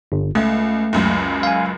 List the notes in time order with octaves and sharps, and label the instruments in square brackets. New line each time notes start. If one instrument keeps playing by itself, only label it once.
[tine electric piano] G1
[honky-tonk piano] C#2 [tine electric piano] A3
[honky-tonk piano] F#1 C#2 F#2
[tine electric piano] F5 G#5